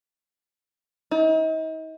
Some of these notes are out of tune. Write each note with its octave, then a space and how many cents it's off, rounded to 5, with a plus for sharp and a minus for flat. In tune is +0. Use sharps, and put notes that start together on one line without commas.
D#4 +40